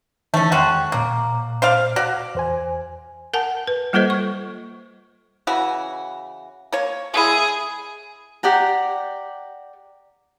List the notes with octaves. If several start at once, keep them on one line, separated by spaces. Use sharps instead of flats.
D#3 E3 A3 C#4 E5
E2 G#3 C#4 F#4 G5 F#6
A#2 A#3 D6
C5 D5 F5
F#4 D5
E2 C5 G#5
A#4 F#5 G#5 A5
B4
G3 A#3 F4 A4 C5 D#5
C#6
C#3 E3 F#4
A#3 C#5
G#3 E4 G#4
G4 D5 F#5 A#5